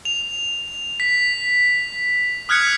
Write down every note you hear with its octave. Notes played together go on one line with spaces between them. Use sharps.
F7
B6
D#6 F6 F#6 G#6 B6 C#7